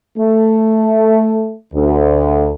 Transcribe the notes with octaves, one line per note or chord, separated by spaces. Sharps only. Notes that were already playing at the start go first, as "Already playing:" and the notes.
A3
D2